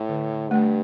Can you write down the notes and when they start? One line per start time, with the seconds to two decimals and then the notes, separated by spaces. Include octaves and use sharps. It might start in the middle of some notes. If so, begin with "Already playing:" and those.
Already playing: A2
0.09 D3
0.30 D3
0.50 G2 A3